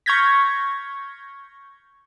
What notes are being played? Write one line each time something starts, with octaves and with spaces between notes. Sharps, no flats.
C#6 F6 G6 G#6 A#6 B6